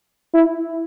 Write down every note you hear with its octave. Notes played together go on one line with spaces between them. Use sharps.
E4